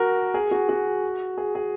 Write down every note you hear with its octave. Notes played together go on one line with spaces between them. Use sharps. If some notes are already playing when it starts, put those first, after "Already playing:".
Already playing: F#4 A#4
G#4
F#4
F#4
G#4
G#4